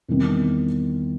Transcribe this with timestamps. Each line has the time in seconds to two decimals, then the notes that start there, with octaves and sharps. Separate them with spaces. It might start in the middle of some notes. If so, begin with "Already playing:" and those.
0.08 E2 C3 D#3 G3 C4